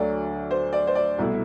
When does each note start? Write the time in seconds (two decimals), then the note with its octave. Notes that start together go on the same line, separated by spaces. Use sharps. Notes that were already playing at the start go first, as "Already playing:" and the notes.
Already playing: D2 D3 F#3 D5
0.51 C5
0.73 D5
0.87 C5
0.95 D5
1.18 C2 B2 A3 E4